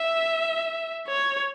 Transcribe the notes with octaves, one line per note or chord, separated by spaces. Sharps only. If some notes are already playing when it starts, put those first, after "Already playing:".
Already playing: E5
C#5